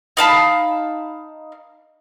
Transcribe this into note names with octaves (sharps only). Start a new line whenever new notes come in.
D#4 F5 A5 B5